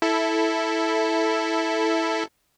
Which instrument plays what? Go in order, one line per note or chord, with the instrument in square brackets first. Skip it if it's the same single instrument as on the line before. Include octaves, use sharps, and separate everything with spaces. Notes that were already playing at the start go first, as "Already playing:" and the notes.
[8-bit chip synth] E4 A4